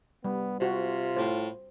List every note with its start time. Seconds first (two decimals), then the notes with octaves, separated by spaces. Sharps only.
0.24 G3 B3
0.60 C3 F4 F#4 C5
1.17 A2 C5